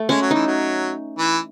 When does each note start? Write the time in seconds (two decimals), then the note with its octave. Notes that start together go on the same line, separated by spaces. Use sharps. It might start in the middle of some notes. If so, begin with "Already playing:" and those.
Already playing: A3
0.09 G#3 C#4
0.21 F#3
0.31 E3 D#4
0.46 F#3
1.18 E3